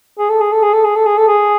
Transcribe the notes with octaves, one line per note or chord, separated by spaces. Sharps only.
G#4
A4
G#4
A4
G#4
A4
G#4
A4
G#4
A4
G#4